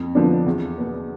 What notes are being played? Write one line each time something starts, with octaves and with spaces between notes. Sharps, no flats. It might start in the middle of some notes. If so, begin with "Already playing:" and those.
Already playing: F2
D3 F3 B3 D4
E2
B2 B3